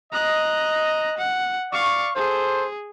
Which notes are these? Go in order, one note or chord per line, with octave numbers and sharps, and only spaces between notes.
D#5 A#5 F#6
F#5
D5 F5 C#6
G#4 A4 C5